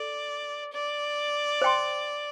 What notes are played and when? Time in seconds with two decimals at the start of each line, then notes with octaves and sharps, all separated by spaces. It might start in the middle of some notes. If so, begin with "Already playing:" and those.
Already playing: A4 D5
0.73 D5
1.62 C5 G5 C6